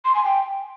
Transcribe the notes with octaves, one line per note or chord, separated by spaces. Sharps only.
C6
G#5
G5